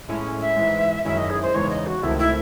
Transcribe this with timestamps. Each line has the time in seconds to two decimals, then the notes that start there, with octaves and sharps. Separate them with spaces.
0.09 A2 G#3 C#4 E4
0.41 E5
0.56 G#2 E3 G#3
1.05 F#2 D#3 G#3 C#4 E4 E5
1.18 D#5
1.30 G#4
1.42 C5
1.54 E2 C#3 E3 G#3 D#4 C#5
1.70 D#5
1.87 F#4
2.03 C#2 C3 D#3 A3 C4 E4
2.19 E4